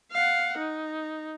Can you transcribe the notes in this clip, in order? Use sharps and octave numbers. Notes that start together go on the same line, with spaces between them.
F5 F#5
D#4